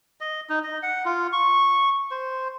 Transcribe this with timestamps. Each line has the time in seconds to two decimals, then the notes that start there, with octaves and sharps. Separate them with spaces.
0.21 D#5
0.50 D#4
0.64 D#5
0.83 F#5
1.05 F4
1.33 C#6
2.11 C5